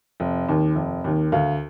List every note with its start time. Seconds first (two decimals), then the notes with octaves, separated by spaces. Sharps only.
0.20 F1
0.48 D#2 D#3
0.75 F1
1.04 D#2 D#3
1.32 D2 F5